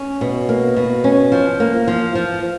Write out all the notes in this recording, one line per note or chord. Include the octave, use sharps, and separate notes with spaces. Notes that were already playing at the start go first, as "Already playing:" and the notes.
Already playing: C#4
B2
A#3
B2
C#4
F3
A#3
F3
F3